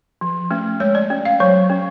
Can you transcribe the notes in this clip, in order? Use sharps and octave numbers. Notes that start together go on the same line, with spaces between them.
F3
A3 C#4
G#3 C#5
D5
C#4
F5
F#3 C#5
C#4